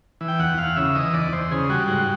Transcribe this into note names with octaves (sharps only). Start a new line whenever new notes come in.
E3
G5
E2 F#5
E2 F5
C#3 E5
E3 D#5
E2 D5
E2 C5
C#3 G#4
G3 F#4
G#2 F#4